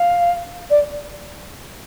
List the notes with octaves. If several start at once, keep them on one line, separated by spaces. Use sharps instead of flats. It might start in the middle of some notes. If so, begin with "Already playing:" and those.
Already playing: F5
D5